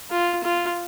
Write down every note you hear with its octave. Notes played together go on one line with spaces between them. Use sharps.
F4
F4